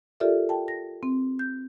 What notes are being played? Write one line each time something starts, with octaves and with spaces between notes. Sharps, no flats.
F4 G4 A4 A#4 D5 E5
G5 A5
A#6
C4
G6